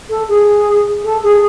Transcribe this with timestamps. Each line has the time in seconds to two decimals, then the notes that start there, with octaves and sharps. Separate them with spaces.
0.09 A4
0.28 G#4
1.04 A4
1.23 G#4